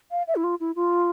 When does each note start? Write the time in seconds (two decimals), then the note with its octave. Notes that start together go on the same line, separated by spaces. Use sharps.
0.11 F5
0.27 E5
0.36 E4
0.44 F4
0.60 E4
0.76 F4